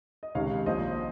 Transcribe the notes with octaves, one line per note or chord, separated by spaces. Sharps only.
D#5
C#2 C3 D#3 C#5 F5
A#1 A#2 F3 C5 D#5